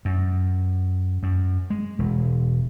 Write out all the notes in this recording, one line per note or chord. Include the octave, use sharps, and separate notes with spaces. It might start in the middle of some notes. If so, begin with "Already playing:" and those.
F#2
F#2
G#3
E1